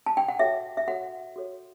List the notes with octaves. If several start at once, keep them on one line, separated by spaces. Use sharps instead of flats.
A5
G5
F#5
F#4 A4 C#5 E5
E5
F#4 A4 C#5 F#5
F#4 A4 C#5